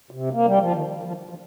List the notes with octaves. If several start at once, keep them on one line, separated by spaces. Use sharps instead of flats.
C3
A#3
G3
F3
D#3
F3
F3